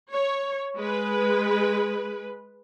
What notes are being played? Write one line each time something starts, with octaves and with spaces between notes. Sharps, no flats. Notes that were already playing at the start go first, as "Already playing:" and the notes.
C#5
G#3 B4